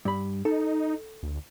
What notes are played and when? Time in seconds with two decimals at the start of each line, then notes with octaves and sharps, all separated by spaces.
0.05 G2 B5
0.45 D#4 A4
1.23 D2